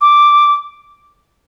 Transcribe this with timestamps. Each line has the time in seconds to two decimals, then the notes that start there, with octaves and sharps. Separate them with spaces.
0.01 D6